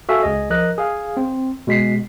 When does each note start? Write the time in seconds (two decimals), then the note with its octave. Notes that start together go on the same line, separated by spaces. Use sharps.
0.09 F#4 A4 E5 F5 G#5
0.23 C#2 G#4 D#5
0.50 F3 A#4 D#5 F#6
0.78 G#4 F5
1.17 C4
1.67 B2 G#3 B6 C7